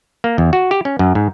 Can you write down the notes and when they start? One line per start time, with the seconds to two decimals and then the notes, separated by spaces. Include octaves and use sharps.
0.24 A#3
0.38 E2
0.53 F#4
0.71 G4
0.85 C#4
0.99 F#2
1.15 G#2